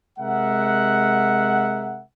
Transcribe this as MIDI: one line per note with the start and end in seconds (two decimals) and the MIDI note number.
0.19 2.01 48
0.19 2.01 56
0.19 2.01 70
0.19 2.01 76
0.19 2.01 78